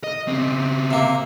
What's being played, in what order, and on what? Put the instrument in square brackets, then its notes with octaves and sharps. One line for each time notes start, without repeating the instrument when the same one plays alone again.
[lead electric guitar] D#5
C#3 C4
[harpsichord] C3 A#3